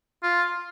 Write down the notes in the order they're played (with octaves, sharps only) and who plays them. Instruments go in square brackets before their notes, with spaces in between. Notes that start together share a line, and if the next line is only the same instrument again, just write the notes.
[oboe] F4